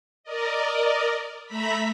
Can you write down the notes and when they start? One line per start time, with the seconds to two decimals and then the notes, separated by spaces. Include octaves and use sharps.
0.24 A#4 D5 D#5
1.46 A3 E5 A#5 B5 B6